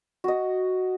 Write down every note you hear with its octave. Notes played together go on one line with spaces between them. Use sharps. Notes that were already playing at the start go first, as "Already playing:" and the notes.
F#4 D#5